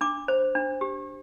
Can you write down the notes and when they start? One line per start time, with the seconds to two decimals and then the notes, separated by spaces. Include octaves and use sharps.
0.01 D4 D6
0.28 C5
0.55 D4
0.81 G4